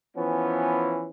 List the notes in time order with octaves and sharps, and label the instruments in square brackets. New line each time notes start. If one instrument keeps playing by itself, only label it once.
[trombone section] E3 F3 B3 C#4